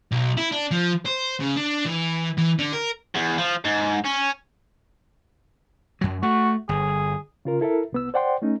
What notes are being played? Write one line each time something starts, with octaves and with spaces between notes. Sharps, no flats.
B1
E4
D4
F3
C5
C#3
D4
E3
E3
D3
A#4
E2
F3
G#2
C#4
F#2 F#3
A3 F#4
G1 G#4
C#3 F4 A#4
E4 A4 A#4 E5
C2 B3 E6
C5 D5 F#5 G5 C6
A3 C#4 D#4